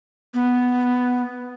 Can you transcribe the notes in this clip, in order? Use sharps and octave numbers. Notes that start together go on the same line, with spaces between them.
B3